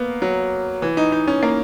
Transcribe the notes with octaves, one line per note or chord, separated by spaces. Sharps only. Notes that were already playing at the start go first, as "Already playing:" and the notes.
Already playing: A#3 B3
F#3
E3
D#4
D#4
C#4
A#3